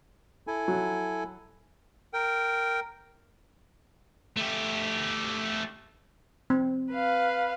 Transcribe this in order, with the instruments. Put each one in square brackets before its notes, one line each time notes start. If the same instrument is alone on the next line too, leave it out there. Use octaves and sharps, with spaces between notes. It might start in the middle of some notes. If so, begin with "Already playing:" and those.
[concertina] E4 A4 G#5
[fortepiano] F#3
[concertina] A#4 G5
[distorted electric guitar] A3 G4
[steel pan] C4
[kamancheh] B4 F5